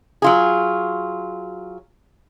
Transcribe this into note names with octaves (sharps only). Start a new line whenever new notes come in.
F#3 F4 G#4